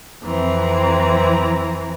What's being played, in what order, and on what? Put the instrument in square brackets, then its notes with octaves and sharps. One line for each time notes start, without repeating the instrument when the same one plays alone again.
[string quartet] F2 E3 C4 A#5